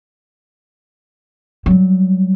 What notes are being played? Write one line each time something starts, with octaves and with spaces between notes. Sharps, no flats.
F#3 G3